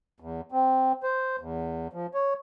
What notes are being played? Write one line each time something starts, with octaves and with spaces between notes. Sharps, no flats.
E2
C4
C5
E2
F3
C#5